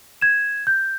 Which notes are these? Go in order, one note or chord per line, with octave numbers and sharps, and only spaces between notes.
G#6 E7
G6